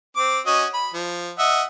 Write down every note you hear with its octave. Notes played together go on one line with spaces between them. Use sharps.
C4 D6
C#4 F#4 D#5
B5
F3
D#5 E5 F#5